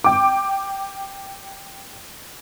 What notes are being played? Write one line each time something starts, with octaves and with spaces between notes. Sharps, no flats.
G5 D6